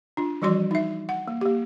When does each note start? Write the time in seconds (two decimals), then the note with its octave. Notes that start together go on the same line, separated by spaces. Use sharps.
0.17 D4 F4
0.42 E3 F3 G3 F#4 D5 C6
0.71 D#4 E5
1.09 F#5
1.28 A#3
1.41 A#3 G4